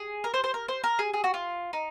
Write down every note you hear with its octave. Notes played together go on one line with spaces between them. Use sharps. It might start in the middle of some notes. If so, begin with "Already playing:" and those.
Already playing: G#4
A#4
C5
C5
A#4
C5
A#4
G#4
G#4
F#4
F4
D#4